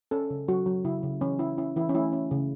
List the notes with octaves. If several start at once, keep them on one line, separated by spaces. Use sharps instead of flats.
C#4 A4
C#3
F#3 F#4
F#3
C#3 E4
C#3
E3 C#4
C#4 E4
C#4 E4
E3 E4
C#4
A3 E4
C#4
C#3